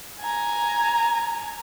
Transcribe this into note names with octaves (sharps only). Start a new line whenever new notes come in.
G#5 A#5